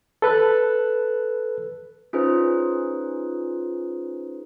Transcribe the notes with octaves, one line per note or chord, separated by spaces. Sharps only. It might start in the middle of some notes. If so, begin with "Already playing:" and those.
A4 B4 F#6
C#4 D#4 F4 G#4 B4 C5